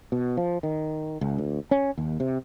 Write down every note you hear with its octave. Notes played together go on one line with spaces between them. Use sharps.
B2
F3
D#3
C#2
D2
C#4
D#2
C3